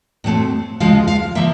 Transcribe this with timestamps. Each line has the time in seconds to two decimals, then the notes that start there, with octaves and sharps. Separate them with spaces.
0.24 A2 F#3 A3 C4
0.80 D2 C#3 F3 G#3 F5
1.07 F5
1.35 D3 F3 A#3 E5